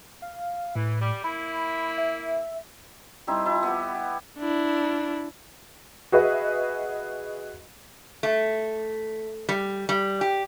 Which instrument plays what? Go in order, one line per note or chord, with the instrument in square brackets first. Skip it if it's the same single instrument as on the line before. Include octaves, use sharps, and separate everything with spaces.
[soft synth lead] F5
[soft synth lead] A2 [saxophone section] E3
[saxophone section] G3
[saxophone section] A#3 E4 [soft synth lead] B5
[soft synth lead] E5
[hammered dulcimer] G3 C4 D#4 E4
F3 E4
B3 G4
G4
[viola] D4 E4
[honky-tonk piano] F#4 G#4 B4 D#5 E5
[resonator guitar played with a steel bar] A3
G3
G3
G4